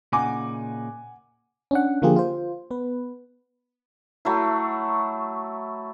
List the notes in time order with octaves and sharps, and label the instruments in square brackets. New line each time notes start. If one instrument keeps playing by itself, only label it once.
[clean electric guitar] A#2 C#3 D#4 [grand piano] F#5 G#5 D6
[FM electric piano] C#4 D4 F#5
D3 F3 A#3 F4 G4 G#4
F4 C5
B3 B4
[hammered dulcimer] F#3 A3 E4